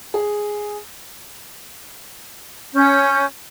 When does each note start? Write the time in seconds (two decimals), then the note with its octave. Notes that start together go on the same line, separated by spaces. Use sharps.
0.14 G#4
2.74 C#4 G6